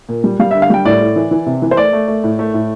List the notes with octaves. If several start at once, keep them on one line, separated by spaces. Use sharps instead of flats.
A#2
G3
G3 F5
E5
D3
F5
G3 G5
A2 D5
A2
E3
E3
C3
E3
C5
A3 D5
A3
A3
A2
A3
A2